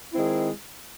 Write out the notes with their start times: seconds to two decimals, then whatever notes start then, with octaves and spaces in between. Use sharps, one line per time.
0.14 D#3 G#3 C4 E4